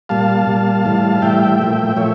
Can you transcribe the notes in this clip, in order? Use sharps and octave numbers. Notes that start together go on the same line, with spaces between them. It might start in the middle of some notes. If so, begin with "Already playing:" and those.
A#2 G3 F5 A5
A#2 G3
A2 E3 G3
A2 E3 G3 E5 G5
A#2 F3 A3
A#2 F3 A3 C#5 E5